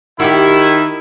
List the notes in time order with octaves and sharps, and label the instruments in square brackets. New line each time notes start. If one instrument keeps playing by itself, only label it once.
[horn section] D#3 E4 [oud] F#4 G4